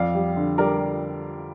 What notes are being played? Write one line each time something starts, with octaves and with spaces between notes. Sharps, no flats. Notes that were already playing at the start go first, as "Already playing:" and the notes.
Already playing: F2 D5 F5
G3
D3
G3 A#4 D5